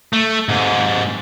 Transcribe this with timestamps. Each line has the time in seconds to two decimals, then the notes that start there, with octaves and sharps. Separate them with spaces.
0.13 A3
0.49 G#2 C3